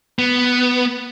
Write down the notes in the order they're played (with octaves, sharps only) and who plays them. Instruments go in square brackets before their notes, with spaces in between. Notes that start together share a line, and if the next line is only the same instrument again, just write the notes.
[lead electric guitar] B3